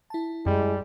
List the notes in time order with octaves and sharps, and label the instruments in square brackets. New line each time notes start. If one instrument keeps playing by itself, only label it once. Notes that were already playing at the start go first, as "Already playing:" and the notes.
[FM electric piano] E4 A5
[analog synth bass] F#2 [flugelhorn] G3 [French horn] G#3